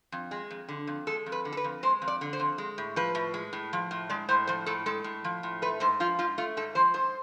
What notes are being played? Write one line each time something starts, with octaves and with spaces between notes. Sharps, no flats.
F2
G#3
F2
D3
F2
G#3 A4
F2
B4
D3
A4
B4
F2
G#3 C5
F2
D5
D3
C5
F2
G#3
A2
F3 B4
A2
G#3
A2
F3
A2
G#3 D5
A2 C5
F3 C5
A2 A4
G#3 A4
A2
F3
A2
A3 B4
G#2 C5
F3 F4
G#2 F4
A3 F4
G#2 A4
F3 C5
G#2 C5